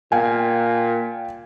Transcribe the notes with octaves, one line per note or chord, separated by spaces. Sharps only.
A#2 F5 G5 G#5